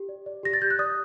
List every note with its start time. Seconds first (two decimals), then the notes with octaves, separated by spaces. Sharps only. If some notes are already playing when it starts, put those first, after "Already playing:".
Already playing: G4
0.09 D5
0.26 D5
0.43 G4 A#6
0.53 A6
0.62 G4 G6
0.70 F#6
0.79 D5 D#6